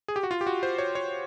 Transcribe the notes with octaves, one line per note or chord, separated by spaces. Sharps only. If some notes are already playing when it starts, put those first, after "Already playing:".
G#4
G4
F#4
F4
G4
F#4
C5
C#5
C#5